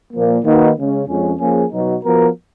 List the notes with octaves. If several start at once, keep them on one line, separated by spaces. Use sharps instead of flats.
A#2 F3 A#3
D#3 A#3 D#4 F#4 B4
C#3 G#3 C#4
F2 F3 G#3 C#4
F3 A#3 C#4 G#4
B2 F#3 B3 D#4 F#4
F3 B3 F#4 A#4